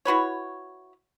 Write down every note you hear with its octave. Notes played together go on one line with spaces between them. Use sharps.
E4 F#4 B4 C#5